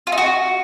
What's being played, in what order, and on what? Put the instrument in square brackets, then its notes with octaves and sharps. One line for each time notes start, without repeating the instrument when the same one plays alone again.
[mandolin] F4
D#4
F#4